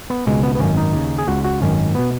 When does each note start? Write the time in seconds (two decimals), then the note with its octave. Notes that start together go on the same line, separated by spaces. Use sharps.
0.10 B3
0.27 C#2 B2 G#3
0.43 B3
0.55 B3
0.60 G#1 F#2 D#3 C#4
0.77 D#4
0.93 D#2 C#3
1.18 G#4
1.27 C#2 C#3 F#4
1.44 F#4
1.62 G#1 F#2 D#3 C#4
1.95 B2 B3